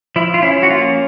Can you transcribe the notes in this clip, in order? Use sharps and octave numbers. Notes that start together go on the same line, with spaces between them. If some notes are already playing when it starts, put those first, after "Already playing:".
F3 E4
F4
C#4 E4
F#4
A#3 F4